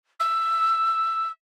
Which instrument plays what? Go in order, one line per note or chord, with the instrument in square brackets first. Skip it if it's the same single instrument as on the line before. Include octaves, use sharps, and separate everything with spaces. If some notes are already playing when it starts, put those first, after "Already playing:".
[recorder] E6